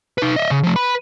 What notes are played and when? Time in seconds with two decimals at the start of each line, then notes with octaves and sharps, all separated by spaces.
0.18 D#4 B4
0.36 D#5 E5
0.51 C#3
0.64 F3 A3
0.76 B4 B5